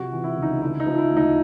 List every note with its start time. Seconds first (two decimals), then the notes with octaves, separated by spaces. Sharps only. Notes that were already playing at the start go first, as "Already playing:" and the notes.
Already playing: C3 F3 F#4
0.12 E3
0.24 E4
0.36 C#2
0.42 D#4
0.62 D3 E4
0.80 D#4
0.86 F3
0.98 E4
1.11 D2
1.17 D#4